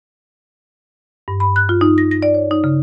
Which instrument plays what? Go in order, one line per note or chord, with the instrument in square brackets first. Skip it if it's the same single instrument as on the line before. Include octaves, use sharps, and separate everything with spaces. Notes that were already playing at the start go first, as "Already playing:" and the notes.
[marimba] G2
B5
F#6
F4
D#4
A#6
A#6
D5
C#5
D#4
C#3